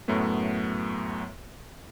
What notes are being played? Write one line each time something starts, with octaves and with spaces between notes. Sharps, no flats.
F#2 A2 F#3 A3 B3